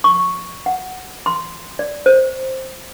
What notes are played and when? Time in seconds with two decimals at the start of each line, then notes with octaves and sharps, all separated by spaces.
0.04 C#6
0.66 F#5
1.26 C6
1.79 D5
2.06 C5